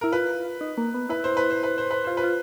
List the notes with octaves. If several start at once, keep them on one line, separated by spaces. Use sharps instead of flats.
E4 A#4
F4 B4
D#4
A#3
B3
E4 B4
C5
B4
C5
B4
C5
B4
F4 C5
B4
F4